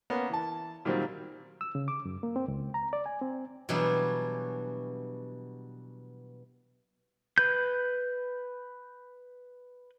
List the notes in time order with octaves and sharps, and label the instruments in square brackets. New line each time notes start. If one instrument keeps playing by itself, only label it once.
[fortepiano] A#3 B3 C#4
E3 A5
A#2 D#3 F#3 G3 C4
[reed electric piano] E6
C#3
D6
F#2
A#3
C4
C#2
A#5
D5
G#5
C4
[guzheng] B2 E3 F#3 G3 D4 G#4
[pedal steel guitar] B4 G6